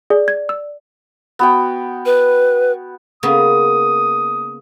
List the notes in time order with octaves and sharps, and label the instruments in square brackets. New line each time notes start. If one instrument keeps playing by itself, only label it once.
[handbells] G#4 [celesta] D5
[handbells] G#6
E6
[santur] B3 F#4 G5
[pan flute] B4
[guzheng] C#3 A#3 B3 [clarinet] D#6